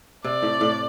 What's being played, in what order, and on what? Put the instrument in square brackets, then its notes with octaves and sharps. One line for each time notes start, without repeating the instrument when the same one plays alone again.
[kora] C3 [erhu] D5
[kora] A2
A2